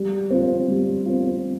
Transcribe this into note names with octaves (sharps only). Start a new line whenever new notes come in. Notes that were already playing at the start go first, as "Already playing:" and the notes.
Already playing: G3
C4 F4
G3
C4 F4